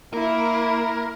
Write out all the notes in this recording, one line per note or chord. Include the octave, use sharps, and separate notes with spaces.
A#3 E4 A#4